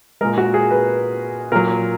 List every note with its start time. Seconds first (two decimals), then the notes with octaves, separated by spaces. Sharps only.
0.21 A#2 G#3 A#4
0.38 F#4
0.54 G#4
0.71 B4
1.52 A#2 F#3 A#4